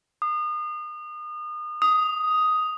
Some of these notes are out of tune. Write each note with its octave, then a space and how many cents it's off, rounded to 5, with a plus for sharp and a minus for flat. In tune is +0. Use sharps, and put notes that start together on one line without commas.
D#6 -35
D#6 +5